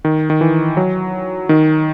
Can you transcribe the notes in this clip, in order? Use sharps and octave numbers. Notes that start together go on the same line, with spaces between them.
D#3
D#3
E3
F#3
D#3